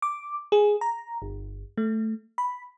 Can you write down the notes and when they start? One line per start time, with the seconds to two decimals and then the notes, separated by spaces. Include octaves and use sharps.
0.02 D6
0.52 G#4
0.81 A#5
1.22 G1
1.78 A3
2.38 B5